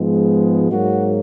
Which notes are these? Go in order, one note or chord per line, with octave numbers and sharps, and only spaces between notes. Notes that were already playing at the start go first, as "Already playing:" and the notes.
Already playing: G#2 F3 G#3 B3
G#2 F#3 A#3 F#4